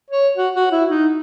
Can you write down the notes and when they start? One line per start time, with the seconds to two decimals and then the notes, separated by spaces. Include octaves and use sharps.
0.10 C#5
0.37 F#4
0.55 F#4
0.72 E4
0.89 D#4